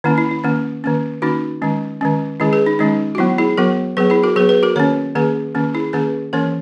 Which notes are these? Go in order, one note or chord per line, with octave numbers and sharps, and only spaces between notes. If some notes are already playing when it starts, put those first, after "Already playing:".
D#3 A#3 C#4 E4
E4
E4
D#3 A#3 C#4
D#3 A#3 C#4
D#3 A#3 C#4 D#4 F#4
D#3 G#3 C#4
D#3 G#3 C#4
D#3 G#3 C#4 E4 G#4
G#4 B4
D#4
D#3 G#3 C#4 D#4
F#4
F#3 B3 E4
E4 G#4
F#3 B3 F#4 A#4
F#3 B3 G#4 B4
E4 G#4
F#4 A#4
F#3 B3 G#4 B4
G#4 B4
F#4 A#4
D#3 A#3 C#4 A#4 C#5
D#3 A#3 C#4 G#4 B4
D#3 A#3 C#4
E4 G#4
D#3 A#3 C#4 G#4 B4
E3 A#3 C#4 A#4 C#5